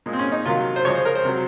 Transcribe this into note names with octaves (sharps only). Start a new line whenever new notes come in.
A#2 G#3
C4
C#4
D#4
C3 D#3 F#3 F4
C5
C#3 F3 G#3 C#5
C5
A#4
C5
C3 F#3